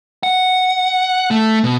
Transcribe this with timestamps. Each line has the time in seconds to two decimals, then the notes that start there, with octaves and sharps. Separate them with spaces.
0.23 F#5
1.31 A3
1.64 B2